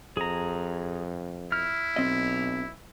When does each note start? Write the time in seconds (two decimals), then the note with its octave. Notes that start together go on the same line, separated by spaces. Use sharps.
0.17 F2 G#4 A#5
1.52 E4 F6
1.96 B1 C4 D#5